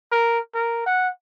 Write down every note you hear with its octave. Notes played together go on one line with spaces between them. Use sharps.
A#4
A#4
F#5